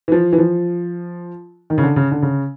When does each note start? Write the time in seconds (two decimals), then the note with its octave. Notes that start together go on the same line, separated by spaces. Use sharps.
0.08 E3
0.12 F3
0.33 E3
0.38 F3
1.70 D#3
1.78 C#3
1.83 D3
1.96 C#3
2.11 D3
2.22 C#3